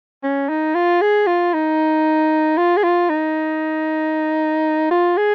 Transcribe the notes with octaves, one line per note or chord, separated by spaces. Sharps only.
C#4
D#4
F4
G#4
F4
D#4
F4
G#4
F4
D#4
F4
G#4